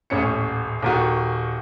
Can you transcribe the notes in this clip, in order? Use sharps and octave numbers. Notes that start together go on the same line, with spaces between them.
D#1 A1 C#4 C#7
D#1 D#3 F#4